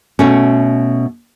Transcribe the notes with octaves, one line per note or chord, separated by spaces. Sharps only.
B2 A3 C#4